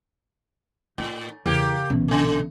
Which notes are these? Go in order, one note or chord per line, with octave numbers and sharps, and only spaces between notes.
A2 D#4
E2 C#3 A#3 G4
B1 A#2 E3 B3 C#4
C#3 A3